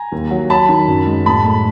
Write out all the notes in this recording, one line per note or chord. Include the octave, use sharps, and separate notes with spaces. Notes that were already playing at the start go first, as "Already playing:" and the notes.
Already playing: G#5 A#5
D#2
F#3
F#3 A5 B5
D#3
F#2
G#3
A2 A5 B5
A3